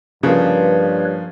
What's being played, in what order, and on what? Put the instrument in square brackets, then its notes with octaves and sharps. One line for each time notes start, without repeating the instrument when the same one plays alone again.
[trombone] G2 [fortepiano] C#3 [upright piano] F3 A#3 F4 [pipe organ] B4 C#5